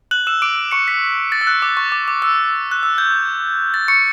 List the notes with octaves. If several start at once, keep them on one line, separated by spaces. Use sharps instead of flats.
F#6 F#7
E6 E7
D6 D7
C#6 C#7
B6
A6
E6
F#6
D6
C#6
D6
D6
E6
F#6
E6
G6
A6
C#6 C#7